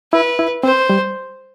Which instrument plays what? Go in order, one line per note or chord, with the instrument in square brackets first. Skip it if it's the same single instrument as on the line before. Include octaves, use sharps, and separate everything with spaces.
[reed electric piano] E4 [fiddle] B4
[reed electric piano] E4
[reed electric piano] C4 [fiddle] C5
[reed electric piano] G3